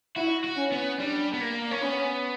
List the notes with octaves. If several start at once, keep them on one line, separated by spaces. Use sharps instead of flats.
E4 F#4
F#4
C#4
B3
G3 D4
B3
A#3
C#4
B3 C#4